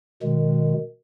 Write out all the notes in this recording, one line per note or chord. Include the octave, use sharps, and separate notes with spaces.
B2 D#3 G#3